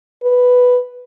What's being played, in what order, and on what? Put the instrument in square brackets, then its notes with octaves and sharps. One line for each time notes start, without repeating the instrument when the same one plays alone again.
[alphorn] B4